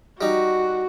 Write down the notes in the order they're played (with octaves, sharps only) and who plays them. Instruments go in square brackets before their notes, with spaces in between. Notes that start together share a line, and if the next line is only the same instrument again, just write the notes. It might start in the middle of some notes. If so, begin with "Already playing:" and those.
[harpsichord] G3 D#4 [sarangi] F#4